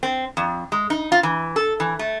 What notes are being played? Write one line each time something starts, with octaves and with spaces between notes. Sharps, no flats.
C4
F2
G#3
D#4
F4
E3
A4
E3
A3